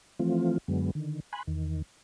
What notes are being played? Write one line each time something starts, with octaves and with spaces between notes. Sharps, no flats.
E3 F3 A3 C4 F4
F#2 D3 F#3 G#3 B3
D3 D#3
G#5 B5 C6 F#6
E2 D#3